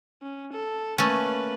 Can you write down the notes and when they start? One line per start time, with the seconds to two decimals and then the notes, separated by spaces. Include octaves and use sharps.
0.23 C#4
0.53 A4
0.98 A3 A#3 C#4 B4